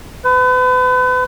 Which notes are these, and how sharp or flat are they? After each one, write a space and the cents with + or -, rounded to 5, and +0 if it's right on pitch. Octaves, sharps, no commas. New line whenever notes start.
B4 +35